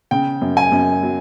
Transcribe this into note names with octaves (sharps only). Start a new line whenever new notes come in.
C#3 G5
F#2
G#5
F#2
F#3